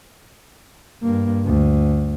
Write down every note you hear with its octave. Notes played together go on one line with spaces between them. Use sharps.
G2 A#3
D2